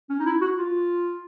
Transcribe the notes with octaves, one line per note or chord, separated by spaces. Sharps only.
C#4
D#4
E4
F#4
F4